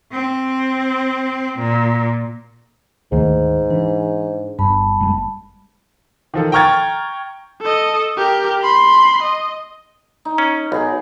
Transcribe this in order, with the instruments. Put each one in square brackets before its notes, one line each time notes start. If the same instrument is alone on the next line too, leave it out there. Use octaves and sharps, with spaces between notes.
[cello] C4
A#2
[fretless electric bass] D2 D#3 A3 [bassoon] G#2
[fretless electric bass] E3 [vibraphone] D4
[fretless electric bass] G1 G2 [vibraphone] G3 A5 B5
[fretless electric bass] F#1 G#3
[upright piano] D#3 F3 A4
G5 A#5 C#6 F6 G#6 A6
[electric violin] A4 D#5
G4 A#4
B5 C6
D#5
[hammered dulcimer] D#4
[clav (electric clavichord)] C#4
[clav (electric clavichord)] B1 [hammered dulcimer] B3 G#4 A#4